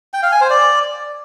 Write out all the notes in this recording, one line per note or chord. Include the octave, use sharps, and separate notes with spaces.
G5
F5
G#5
C5
D5